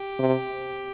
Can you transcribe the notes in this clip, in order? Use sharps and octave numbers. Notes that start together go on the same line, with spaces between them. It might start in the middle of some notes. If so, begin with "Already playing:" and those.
Already playing: G4
C3